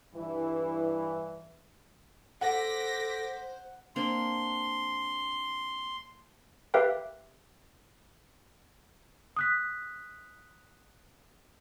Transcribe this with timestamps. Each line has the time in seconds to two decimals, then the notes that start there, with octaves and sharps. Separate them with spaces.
0.14 G2 E3
2.41 A4 C5 F#5 D6 A#6 B6
3.96 A#3 C4 D4 C6
6.74 G4 A#4 B4 E5 F5 G5
9.37 D#6 F#6 B6